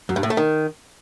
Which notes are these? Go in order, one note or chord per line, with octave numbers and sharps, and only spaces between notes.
F#2
G2
A2
A3
D#3